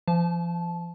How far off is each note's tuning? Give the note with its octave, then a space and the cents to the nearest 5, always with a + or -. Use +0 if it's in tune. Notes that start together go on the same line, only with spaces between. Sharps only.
F3 -35 A5 -20